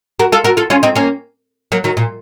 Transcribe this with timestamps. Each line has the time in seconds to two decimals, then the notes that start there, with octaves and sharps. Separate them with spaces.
0.19 F#4 A#4
0.32 F4 A4
0.44 F#4 A#4
0.57 F4 A4
0.70 C#4 F4
0.83 C4 D#4
0.95 A#3 C#4
1.72 F#3 A#3
1.84 D#3 F#3
1.97 A#2